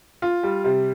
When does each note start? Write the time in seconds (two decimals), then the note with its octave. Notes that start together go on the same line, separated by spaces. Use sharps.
0.22 F4
0.43 G3
0.64 C3